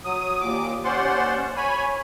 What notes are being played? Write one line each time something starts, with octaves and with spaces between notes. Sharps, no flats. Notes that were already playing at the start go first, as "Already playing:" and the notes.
F#3 D#6
D#2 A#2 D6
D#2 C#4 C5 D5 F#5 C6
C#5 G#5 B5